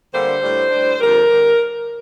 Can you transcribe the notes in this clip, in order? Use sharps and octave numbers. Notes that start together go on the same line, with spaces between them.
D3 G3 A#3 D4 C5
A2 G3 D4
A2 G3 D4
F2 D3 G3 A#4
D3 G3